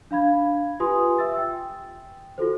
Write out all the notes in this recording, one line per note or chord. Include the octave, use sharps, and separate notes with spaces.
D4 F5 B5 G#6
F4 G4 B4 G#5 C6 D#6
E5 E6 A6
G5
F4 F#4 A4 C5